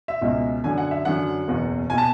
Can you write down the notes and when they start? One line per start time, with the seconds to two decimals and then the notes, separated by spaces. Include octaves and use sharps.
0.08 E5
0.21 C#2 B2 G#3
0.64 F#2 D3 F#3 G#5
0.78 F#5
0.91 E5
1.05 F#2 D3 F#3 F#5
1.47 F#1 E2 B2
1.90 B2 G#5
1.98 A5